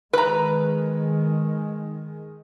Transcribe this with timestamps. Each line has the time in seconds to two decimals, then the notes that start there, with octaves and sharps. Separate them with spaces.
0.13 D#3 G#3 B4 A#5